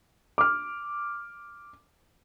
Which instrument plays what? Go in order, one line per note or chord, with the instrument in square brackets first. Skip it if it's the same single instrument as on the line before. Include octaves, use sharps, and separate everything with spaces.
[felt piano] D6 F6